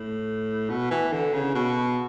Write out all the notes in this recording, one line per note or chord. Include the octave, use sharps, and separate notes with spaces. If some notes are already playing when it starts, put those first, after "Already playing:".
Already playing: A2
B2
E3
D3
C#3
B2